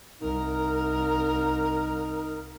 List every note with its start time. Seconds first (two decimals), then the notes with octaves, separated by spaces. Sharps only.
0.21 C2 D#4 A#4